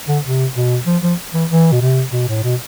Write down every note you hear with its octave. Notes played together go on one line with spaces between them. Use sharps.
D3
C3
B2
F3
F3
E3
E3
B2
C3
B2
A2
B2